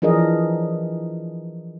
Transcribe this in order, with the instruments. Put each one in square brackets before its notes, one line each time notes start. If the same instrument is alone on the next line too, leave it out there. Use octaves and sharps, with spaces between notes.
[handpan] E3 F3 D4 G#4 A#4 D#5